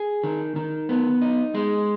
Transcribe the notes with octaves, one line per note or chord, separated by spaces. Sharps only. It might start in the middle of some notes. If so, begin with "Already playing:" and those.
Already playing: G#4
D#3
D#3
B3
D#4
G#3